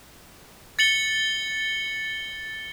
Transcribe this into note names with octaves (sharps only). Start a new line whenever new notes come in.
A6 C#7 F#7 G7